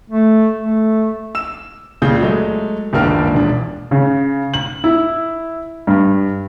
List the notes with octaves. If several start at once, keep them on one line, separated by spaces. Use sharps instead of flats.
A3
A3
E6 E7
C#2 A#2 C#3 G6
F#3 G#3 A3
F#1 C#2 D#3 A#3 D4 F6
E1 D4
C#3
F#7
E4
G2